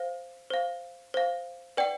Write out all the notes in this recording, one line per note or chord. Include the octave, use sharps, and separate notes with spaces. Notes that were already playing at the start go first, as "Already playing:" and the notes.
Already playing: C5 F5
C5 F5
C5 F5
B4 D5 F#5 G5